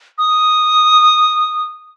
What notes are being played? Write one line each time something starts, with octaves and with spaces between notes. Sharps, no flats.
D#6